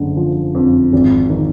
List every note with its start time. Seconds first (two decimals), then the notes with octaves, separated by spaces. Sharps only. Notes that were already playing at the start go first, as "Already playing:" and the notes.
Already playing: F#1 D3
0.17 F3
0.55 F2
0.93 G#1
1.30 D#3